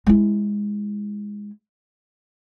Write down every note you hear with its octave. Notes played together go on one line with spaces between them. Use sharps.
G#3 E4